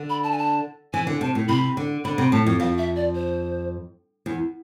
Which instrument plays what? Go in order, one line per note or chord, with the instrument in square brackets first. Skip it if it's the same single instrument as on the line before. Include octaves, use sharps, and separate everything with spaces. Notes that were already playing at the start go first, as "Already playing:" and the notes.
Already playing: [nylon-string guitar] D3
[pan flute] B5
A5
G#5
A5
[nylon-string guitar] E3 [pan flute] G#5
[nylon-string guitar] D3
[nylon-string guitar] C3 [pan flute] A5
[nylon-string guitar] A2
[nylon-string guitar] C3 [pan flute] B5
[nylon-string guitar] D3
[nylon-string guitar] D3 [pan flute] B5
[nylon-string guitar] C3 [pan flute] B5
[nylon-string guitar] A2 [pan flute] A5
[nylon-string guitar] F2
[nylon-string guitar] F2 [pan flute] F5
[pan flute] E5
D5
C5
[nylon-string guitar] E2